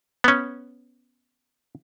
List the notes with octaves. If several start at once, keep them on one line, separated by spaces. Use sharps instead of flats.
B3 C#4